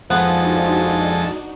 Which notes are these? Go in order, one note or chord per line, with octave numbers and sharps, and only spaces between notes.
F2 F3 G#3 B3 D4 D#4 F#4 A4